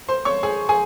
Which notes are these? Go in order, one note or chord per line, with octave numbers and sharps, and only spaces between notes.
C5 C6
C#5 C#6
G#4 G#5
G#4 G#5